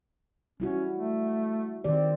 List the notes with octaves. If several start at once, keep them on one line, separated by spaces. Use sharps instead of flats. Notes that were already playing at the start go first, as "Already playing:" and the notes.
G3 C#4 E4 F#4
A3
D#3 C4 G4 D5